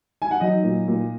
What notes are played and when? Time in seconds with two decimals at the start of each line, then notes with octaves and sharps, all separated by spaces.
0.22 G#5
0.31 F#5
0.40 F#3 D#4 D#5
0.64 A#2
0.88 A#2